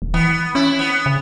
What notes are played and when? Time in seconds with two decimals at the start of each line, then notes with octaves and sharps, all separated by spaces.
0.02 D#1
0.14 E3 B3
0.55 C#4 E4
0.79 B3
1.06 C#3